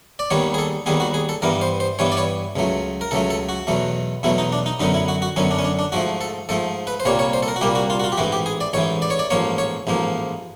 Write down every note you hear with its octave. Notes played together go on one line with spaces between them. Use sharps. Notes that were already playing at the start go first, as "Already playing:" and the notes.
D5
D#2 D#3 G3 B3 C#5
G#4
A4
D#2 D#3 G3 B3 G#4
F#4
G#4
A4
G2 E3 G3 B3 A#4
C5
C5
G2 E3 G3 B3 C#5
D5
C#5
C#2 C#3 F#3 A3
A#4
C#2 C#3 F#3 A3 A4
A4
F#4
E2 B2 F#3 A3
E2 B2 F#3 A3 E4
D#4
D4
D#4
F#2 D3 F#3 B3 D#4
E4
F#4
F#4
F#2 D3 F#3 B3 C#4
D4
C#4
D4
D4
G#2 F3 A3 F#4
A4
G#2 F3 A3 A4
B4
C5
C2 A#2 G3 A#3 C#5
C#5
C5
A4
A#4
F#4
C2 A#2 G3 A#3 G4
F#4
F4
F#4
F4
G4
A1 G#2 E3 F#4
G4
G#4
D5
A1 G#2 E3 C#5
D5
C#5
D5
A1 G#2 F3 A#3 C#5
C#5
A1 G#2 F3 A#3